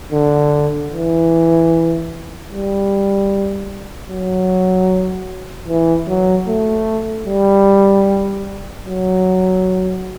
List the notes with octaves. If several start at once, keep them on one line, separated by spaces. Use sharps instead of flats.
D3
E3
G3
F#3
E3
F#3
A3
G3
F#3